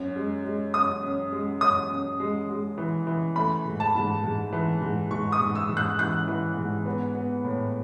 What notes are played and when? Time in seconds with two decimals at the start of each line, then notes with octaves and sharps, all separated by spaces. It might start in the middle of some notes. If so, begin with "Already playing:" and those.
Already playing: F#2
0.16 G#3
0.45 G#3
0.74 F#2 D#6
1.03 F#2
1.32 G#3
1.61 F#2 D#6
1.90 F#2
2.20 G#3
2.49 G#3
2.78 E3
3.07 E3
3.36 A3 B5
3.65 G#2
3.80 A5
3.95 G#2
4.24 G#2
4.53 E3
4.81 G#2
5.11 G#2 C#6
5.32 D#6
5.40 G#2
5.55 E6
5.69 G#2
5.77 F#6
5.99 E3 F#6
6.28 E3
6.57 G#2
6.86 B3
7.15 B3
7.44 A2